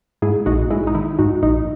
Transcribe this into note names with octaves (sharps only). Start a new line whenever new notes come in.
G#2 E4 G#4
A#1 D#4 F#4
G#3 E4
D#4
D#3 E4
G#2 D#4 F#4
A#1 D#4